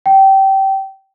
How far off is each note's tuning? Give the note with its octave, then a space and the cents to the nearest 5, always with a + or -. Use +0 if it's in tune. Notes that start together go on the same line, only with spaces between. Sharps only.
G5 -20